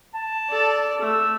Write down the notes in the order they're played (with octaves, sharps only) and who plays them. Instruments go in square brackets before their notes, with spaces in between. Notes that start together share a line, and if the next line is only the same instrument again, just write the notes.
[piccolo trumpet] A5
[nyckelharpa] A4 D5
[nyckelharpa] A3 [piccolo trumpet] E6